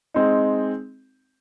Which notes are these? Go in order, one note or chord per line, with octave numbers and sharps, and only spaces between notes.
G#3 C4 D#4